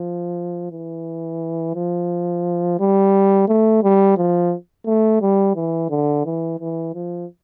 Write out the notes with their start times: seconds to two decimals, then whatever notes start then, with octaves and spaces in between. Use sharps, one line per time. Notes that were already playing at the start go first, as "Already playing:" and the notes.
Already playing: F3
0.72 E3
1.75 F3
2.80 G3
3.48 A3
3.83 G3
4.17 F3
4.86 A3
5.22 G3
5.56 E3
5.90 D3
6.25 E3
6.60 E3
6.94 F3